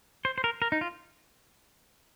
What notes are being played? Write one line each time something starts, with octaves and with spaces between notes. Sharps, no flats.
C5
C5
A#4
A#4
D#4
F4